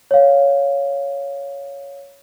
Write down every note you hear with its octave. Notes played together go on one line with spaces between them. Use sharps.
C#5 F5